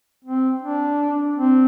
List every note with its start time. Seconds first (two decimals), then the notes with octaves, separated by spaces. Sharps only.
0.25 C4
0.62 D4
1.37 C4